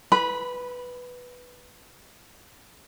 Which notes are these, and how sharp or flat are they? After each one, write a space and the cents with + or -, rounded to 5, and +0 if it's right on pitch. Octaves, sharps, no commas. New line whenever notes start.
B4 +0 B5 -20